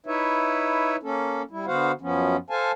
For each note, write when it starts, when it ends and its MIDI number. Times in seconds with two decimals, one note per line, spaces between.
0.06 0.96 63
0.06 0.96 64
0.06 0.96 71
0.06 0.96 73
0.06 0.96 76
1.03 1.42 58
1.03 1.42 61
1.03 1.42 69
1.51 1.66 55
1.51 1.66 64
1.67 1.92 50
1.67 1.92 59
1.67 1.92 66
1.67 1.92 72
1.67 1.92 77
1.67 1.92 78
2.01 2.37 42
2.01 2.37 53
2.01 2.37 59
2.01 2.37 61
2.50 2.72 69
2.50 2.72 72
2.50 2.72 77
2.50 2.72 80
2.50 2.72 81